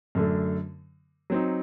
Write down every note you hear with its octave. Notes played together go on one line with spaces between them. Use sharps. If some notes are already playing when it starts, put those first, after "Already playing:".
F#2 D3 A3
F#3 C4 D#4